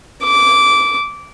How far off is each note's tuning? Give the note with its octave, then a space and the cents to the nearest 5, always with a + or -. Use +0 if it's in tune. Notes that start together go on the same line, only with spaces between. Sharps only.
D6 -15